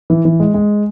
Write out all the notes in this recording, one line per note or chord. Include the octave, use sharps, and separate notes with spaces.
E3
E3
G#3
G#3